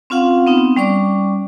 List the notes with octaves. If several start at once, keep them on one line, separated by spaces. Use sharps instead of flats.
C4 C#4 F4 F5 F#5
B3 C4 D#4
G3 C#4 D5 C#6 D6